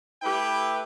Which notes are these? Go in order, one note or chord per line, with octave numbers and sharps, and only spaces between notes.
A3 E4 G4 B4 G5